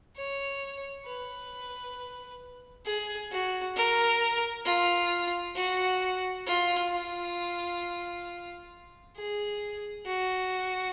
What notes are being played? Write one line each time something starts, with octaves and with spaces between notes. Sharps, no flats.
C#5
B4
G#4
F#4
A#4
F4
F#4
F4
F4
G#4
F#4